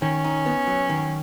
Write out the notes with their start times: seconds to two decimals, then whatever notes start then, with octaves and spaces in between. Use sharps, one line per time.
0.02 D#3 C#4
0.24 D#4
0.46 B3
0.67 F#3
0.89 D#3